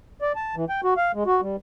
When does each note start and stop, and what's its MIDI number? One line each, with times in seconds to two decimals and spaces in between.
0.21 0.32 74
0.36 0.55 81
0.56 0.65 52
0.69 0.81 79
0.84 0.94 66
0.97 1.12 77
1.15 1.23 56
1.26 1.41 66
1.42 1.56 55